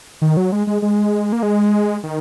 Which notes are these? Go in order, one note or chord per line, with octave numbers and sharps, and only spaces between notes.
D#3
F#3
G#3
G#3
G#3
A#3
G#3
D#3